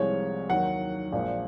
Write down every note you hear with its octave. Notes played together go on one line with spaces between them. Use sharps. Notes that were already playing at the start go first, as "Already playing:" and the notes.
Already playing: C2 C3 F3 G#3 C#5
D#2 D#3 F#3 F#5
A#1 A#2 F3 G#3